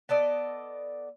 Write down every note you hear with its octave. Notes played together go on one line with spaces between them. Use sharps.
B3 A4 D5 D#5